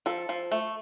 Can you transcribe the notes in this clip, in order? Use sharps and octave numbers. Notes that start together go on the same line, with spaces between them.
F3 A4
F3
A3